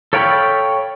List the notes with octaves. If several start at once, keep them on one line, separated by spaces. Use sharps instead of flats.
A4 C#5 F5 G5 B5